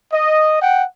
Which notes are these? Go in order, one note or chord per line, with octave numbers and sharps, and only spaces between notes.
D#5
F#5 G5